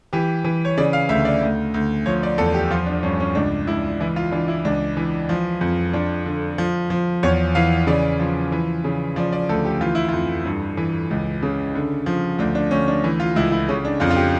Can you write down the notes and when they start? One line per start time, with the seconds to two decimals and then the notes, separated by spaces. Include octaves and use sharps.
0.13 E3 G4
0.44 E3
0.65 C#5
0.77 C#3 D5
0.93 F5
1.09 D2 E5
1.25 D5
1.42 D2
1.74 D2
2.06 F3 C#5
2.23 D5
2.38 E2 A4
2.54 G4
2.71 F3 F4
2.86 D4
3.03 G2 C#4
3.20 C#4
3.35 C#2 D4
3.67 C#2 E4
4.00 E3 E4
4.16 F4
4.32 E3 D4
4.48 E4
4.65 C#2 D4
4.97 E3
5.29 F3
5.61 F2
5.93 F3 D4
6.25 D3
6.58 F3
6.90 F3
7.23 E2 C#5
7.55 E3 F5
7.87 C#3 D5
8.19 F3
8.52 E3
8.84 C#3
9.16 F3 D5
9.33 D5
9.49 D2 A4
9.65 G4
9.81 E3 F4
9.95 E4
10.08 F2 F4
10.45 G2
10.77 E3
11.11 C#2
11.42 C#3
11.75 D3
12.06 F3
12.39 D2 D4
12.55 D4
12.71 D2 C#4
12.88 D4
13.04 E3
13.20 F4
13.36 C#2 E4
13.52 E4
13.69 C#3 C#4
13.85 D4
14.00 F2 F4
14.10 F4
14.16 G4